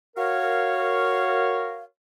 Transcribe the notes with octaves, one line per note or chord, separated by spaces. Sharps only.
F#4 A#4 C#5 F5